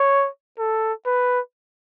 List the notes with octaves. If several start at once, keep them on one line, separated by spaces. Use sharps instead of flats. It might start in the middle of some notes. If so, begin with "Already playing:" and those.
Already playing: C#5
A4
B4